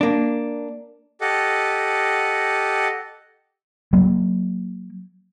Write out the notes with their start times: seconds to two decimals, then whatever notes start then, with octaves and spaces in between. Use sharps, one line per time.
0.01 A#3 D4
1.21 G4 A4 D#5 F#5
3.93 F#3 A#3